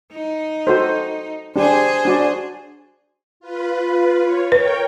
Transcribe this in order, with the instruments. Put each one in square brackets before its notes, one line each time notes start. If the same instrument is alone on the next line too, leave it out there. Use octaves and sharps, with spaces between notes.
[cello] D#4
[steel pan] F#4 A4 C5
[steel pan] D4 G4 [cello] G#4 C5
[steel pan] D4 F#4 D5
[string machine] F4 B4
F4 C#5
[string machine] A#4 C#5 G5 [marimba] B4